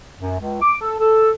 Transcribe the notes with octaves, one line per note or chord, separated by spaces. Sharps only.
F#2
C#2
D6
A4
A4